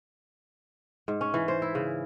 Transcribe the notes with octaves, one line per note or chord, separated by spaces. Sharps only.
G#2
C#4
E3
C5
E4
C#3